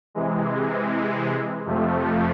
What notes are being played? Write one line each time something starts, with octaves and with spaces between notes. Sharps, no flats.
C3 E3 G#3
F2 C3 F3 A3